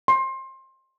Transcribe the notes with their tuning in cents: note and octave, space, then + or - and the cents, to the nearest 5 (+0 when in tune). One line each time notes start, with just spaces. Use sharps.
C6 +20